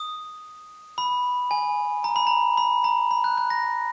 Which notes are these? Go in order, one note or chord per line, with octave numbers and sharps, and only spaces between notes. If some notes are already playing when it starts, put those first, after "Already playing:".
Already playing: D#6
B5
G#5
A#5
B5
A#5
B5
A#5
B5
F#6
F#6
A#6